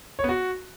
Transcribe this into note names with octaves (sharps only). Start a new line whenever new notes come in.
C#5
B3
F#4